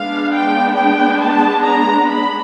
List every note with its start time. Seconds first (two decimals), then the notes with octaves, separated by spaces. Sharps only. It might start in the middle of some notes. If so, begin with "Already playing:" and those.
Already playing: G#3 B3 D4 F5
0.32 G5
0.76 G5
1.20 A5
1.63 A#5
2.08 B5